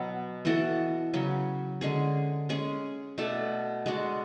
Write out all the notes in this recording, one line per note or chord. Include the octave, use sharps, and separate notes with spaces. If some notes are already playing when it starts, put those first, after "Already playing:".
Already playing: B2 F#3 B3
E3 B3 F#4 A4
C#3 F#3 C#4
D3 G#3 C#4 G#4
G#3 C#4 G#4
B2 A3 D4 A4
G#3 D4 F#4